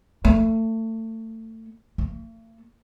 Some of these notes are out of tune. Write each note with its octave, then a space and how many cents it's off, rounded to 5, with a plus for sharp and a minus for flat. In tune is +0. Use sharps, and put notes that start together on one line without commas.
A3 +25
A3 +45